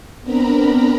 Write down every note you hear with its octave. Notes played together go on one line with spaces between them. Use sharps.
B3 C4 D4 A#4 A#5 B5